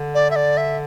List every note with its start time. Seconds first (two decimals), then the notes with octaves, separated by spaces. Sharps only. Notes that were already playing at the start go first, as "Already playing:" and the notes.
Already playing: D3
0.15 D5
0.31 E5
0.36 D5
0.57 E5